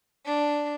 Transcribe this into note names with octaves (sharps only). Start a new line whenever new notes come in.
D4